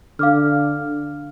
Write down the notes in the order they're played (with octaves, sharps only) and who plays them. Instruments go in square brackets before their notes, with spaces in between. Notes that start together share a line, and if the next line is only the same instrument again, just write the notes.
[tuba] D3 [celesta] F5 D6 F6